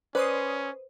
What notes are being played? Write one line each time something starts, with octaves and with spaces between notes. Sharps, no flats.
C#4 B4 C5 D5 C6 D#6